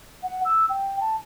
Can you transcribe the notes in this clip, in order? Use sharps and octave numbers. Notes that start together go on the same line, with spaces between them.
F#5
E6
G5
A5